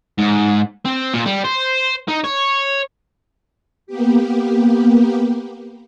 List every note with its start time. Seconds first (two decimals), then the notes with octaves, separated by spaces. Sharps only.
0.19 G#2
0.85 C4
1.14 A#2
1.26 G3
1.44 C5
2.09 D#4
2.24 C#5
3.87 A#3 B3 G4